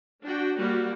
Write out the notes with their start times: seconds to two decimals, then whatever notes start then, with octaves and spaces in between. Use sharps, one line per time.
0.23 D4 F#4 G5
0.58 G3 A#3 F#4 G4